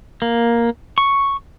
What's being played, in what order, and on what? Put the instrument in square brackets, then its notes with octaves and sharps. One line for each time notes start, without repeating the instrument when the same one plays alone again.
[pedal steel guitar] A#3
C#6